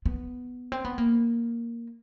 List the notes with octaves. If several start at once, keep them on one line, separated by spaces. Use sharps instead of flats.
B3
C4
B3
A#3